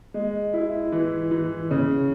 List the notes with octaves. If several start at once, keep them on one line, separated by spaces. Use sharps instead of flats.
G#3
E4
E3
E3
C#3